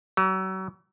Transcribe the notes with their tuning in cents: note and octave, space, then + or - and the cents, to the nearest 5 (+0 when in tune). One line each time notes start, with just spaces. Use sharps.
F#3 +35